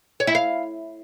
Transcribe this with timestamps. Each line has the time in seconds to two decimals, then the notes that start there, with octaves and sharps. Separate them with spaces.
0.20 C#5
0.27 E4
0.35 F5